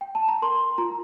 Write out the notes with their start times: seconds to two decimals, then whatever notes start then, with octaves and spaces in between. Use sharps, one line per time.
0.01 G5
0.15 A5
0.28 A#5
0.42 A#4 C6
0.78 F4 A#5